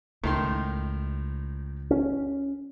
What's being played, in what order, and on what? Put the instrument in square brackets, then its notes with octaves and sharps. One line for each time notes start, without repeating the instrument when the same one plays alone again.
[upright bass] C#2 [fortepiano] A2 D#3 C6
[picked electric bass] C#4